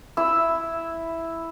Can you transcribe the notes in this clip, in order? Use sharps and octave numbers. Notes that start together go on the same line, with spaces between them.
E4 E6